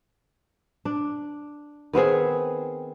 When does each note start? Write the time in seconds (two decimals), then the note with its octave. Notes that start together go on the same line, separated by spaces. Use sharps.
0.85 D4
1.93 D#3 B3 C4 G#4